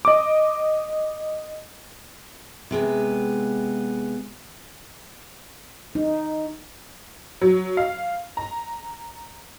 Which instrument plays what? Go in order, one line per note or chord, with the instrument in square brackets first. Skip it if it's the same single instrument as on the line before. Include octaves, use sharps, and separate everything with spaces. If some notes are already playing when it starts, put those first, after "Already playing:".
[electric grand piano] D#5 D6
[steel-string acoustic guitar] C3 G#3 B3
[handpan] D#4
[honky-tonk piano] F#3
F5
A#5